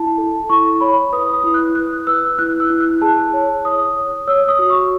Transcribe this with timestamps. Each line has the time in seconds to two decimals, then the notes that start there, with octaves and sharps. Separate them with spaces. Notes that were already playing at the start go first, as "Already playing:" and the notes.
Already playing: E4 A5
0.18 A4
0.50 E4 C#6
0.81 C#5 B5
1.12 B4 D#6
1.33 D#6
1.44 E4
1.54 F#6
1.75 B4 F#6
2.07 B4 E6
2.39 E4 F#6
2.60 E6
2.70 E4
2.81 F#6
3.02 G#4 A5
3.33 C#5
3.65 C#5 D#6
3.96 C#5
4.27 C#5 E6
4.48 D#6
4.59 F#4
4.70 C#6